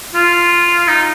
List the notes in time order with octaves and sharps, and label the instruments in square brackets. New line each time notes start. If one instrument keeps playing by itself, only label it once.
[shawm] F4
D#4